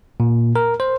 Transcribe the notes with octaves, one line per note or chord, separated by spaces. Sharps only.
A#2
A#4
C5